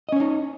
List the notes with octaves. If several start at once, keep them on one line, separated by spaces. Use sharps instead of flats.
C#4 D#4 C#5 D#5